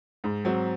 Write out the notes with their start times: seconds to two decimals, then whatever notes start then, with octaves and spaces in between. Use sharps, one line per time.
0.24 G#2
0.45 F#3 C4